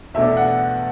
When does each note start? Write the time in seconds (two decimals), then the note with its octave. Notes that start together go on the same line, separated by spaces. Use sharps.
0.14 E2 B2 A3 D4 E5
0.37 F#5